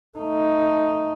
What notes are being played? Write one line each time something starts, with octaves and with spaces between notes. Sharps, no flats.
A3 D#4